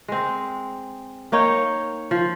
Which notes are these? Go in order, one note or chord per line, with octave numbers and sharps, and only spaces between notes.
G#3 C4
A#3 D#4 C#5 G5
F3